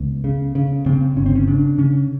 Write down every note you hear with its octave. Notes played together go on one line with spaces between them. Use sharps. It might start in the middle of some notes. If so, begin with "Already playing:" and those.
Already playing: C#2 B3
C#3
C#3
C#3 C4
G1 C#4
C4
C#4
C#3 D4
C#3 C#4